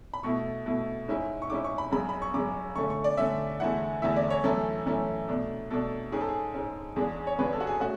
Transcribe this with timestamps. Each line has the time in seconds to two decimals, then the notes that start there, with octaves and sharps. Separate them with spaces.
0.14 B5
0.23 B2 A3 E4 C#6
0.66 B2 A3 E4
1.08 G#2 G#3 C#4 E4
1.42 C#6
1.50 G#2 G#3 C#4 E4 D6
1.64 C#6
1.78 B5
1.91 F#2 C#3 G#3 B5
2.09 B5
2.22 C#6
2.34 F#2 C#3 G#3 D6
2.76 D3 A3 C#4 C#6
2.90 C#6
3.04 D5
3.17 D3 A3 C#4 E5
3.60 E2 D3 A3 E4 F#5
4.02 E2 D3 A3 E4 E5
4.16 D5
4.30 C#5
4.44 F#2 E3 A3 C#4 E4 A4
4.86 F#2 E3 A3 C#4 E4
5.28 B2 A3 D4
5.70 B2 A3 D4 A4
6.12 G#2 G#3 C#4 G#4
6.20 A4
6.28 G#4
6.54 G#2 G#3 C#4
6.96 E2 C#3 G#3 D4 G#4
7.27 C#5
7.39 E2 C#3 G#3 D4 B4
7.53 A4
7.60 F#4
7.67 G#4
7.80 A3 C#4 F#4